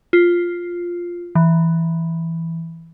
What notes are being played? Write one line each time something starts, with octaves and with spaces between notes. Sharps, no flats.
F4
E3